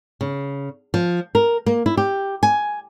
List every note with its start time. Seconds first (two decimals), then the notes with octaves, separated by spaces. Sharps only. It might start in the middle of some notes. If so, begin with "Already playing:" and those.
0.21 C#3
0.94 F3
1.35 A#4
1.66 A#3
1.86 E4
1.97 G4
2.43 G#5